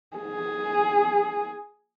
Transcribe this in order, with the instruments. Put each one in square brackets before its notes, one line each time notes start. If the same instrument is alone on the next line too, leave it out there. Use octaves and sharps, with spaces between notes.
[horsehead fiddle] G#4